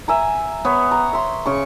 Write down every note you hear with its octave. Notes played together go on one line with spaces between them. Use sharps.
E5 G#5 A#5
B3 C#5
A#5
E5 C6
C#3 C#6